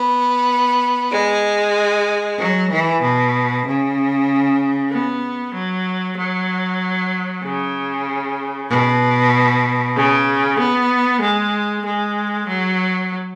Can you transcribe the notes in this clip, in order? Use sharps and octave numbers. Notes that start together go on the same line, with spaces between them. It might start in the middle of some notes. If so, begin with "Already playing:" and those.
Already playing: B3
G#3
F#3
E3
B2
C#3
B3
F#3
F#3
C#3
B2
C#3
B3
G#3
G#3
F#3